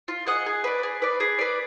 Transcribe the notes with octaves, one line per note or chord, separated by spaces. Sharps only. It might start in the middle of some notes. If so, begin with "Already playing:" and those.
F4
G#4 D#5 F#5
G#4
B4 D5
G#4
B4 D5
G#4
B4 D5